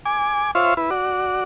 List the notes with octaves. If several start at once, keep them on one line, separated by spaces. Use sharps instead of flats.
G#5 D6
F4 C5 C#5 E5 F5
E4 B4
F#4 D5